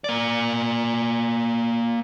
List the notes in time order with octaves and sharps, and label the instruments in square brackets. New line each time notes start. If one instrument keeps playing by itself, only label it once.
[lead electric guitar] A#3 D5